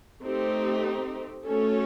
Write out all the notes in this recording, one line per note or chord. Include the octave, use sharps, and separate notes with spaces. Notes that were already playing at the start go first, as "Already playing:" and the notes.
A3 C4 D#4 G4
A3 C#4 F#4 A4 C#5